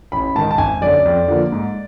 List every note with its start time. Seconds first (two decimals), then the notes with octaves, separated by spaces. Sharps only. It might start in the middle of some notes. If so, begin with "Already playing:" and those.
0.12 A1 B5
0.35 G#2 D#3 A5
0.51 A5
0.58 G#1 G#5
0.81 F#2 D3 D5
1.05 F2
1.28 D3 F3 A#3
1.52 G#2